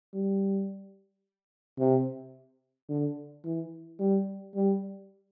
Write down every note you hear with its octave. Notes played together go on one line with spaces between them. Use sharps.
G3
C3
D3
E3
G3
G3